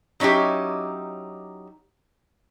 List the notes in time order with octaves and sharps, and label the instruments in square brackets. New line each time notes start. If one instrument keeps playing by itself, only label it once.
[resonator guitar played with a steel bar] F#3 C#4 D#4 E4 G4